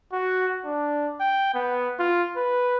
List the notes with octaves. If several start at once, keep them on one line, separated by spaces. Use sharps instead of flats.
F#4
D4
G5
B3
F4
B4